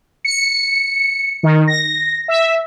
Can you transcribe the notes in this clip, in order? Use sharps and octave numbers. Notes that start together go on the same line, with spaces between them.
C#7
D#3
A#6
E5